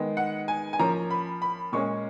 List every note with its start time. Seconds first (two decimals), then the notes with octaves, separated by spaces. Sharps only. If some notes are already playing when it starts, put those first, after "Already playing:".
Already playing: D#3 G#3 B3
0.17 F#5
0.48 G#5
0.73 G#5
0.79 F3 A#3 C#4 A#5
1.11 B5
1.42 B5
1.73 A#2 G#3 C#4 C#6